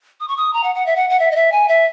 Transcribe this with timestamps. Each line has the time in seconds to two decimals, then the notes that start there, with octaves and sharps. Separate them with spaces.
0.20 D#6
0.28 C#6
0.37 D#6
0.53 A#5
0.63 F#5
0.75 F#5
0.86 E5
0.96 F#5
1.10 F#5
1.19 E5
1.31 D#5
1.36 E5
1.52 G#5
1.68 E5